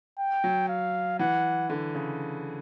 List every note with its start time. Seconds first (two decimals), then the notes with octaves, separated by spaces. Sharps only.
0.19 G5
0.44 F#3
0.69 F5
1.19 E3 F#5
1.70 D3
1.95 C#3